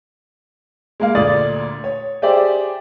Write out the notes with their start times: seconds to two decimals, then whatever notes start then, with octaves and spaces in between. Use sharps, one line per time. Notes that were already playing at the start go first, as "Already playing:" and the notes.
1.00 G#3 A#3 F5
1.15 D2 A#2 D5 D#6 A6
1.84 C#5
2.22 G4 G#4 C5 D5 E5 G5